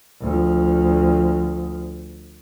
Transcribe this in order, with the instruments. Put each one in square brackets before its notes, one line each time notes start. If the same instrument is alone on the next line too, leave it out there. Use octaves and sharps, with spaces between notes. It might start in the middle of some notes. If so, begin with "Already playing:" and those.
[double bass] D2 F3